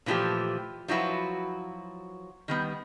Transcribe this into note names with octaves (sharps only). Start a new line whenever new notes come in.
A#2 E3 F3 A3 G4
F3 F#3 E4 F#4 B4
D#3 G3 B3